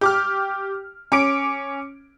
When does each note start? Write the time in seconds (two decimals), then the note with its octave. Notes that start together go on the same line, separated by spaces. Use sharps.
0.01 G4 D6 F6
1.12 C#4 D6 D7